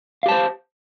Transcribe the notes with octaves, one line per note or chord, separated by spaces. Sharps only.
G4 C5 F5 A5